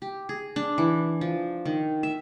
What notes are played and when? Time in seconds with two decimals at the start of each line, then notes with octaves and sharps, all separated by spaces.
0.02 G4
0.29 G#4
0.56 D4
0.78 E3
1.21 F3
1.65 D#3
2.03 E5